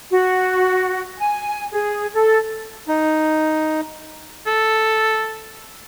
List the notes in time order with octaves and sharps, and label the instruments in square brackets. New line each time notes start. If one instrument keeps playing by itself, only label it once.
[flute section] F#4
G#5
G#4
A4
[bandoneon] D#4
[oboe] A4